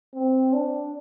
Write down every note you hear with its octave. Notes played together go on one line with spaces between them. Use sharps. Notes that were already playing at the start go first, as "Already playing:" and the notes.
C4
D4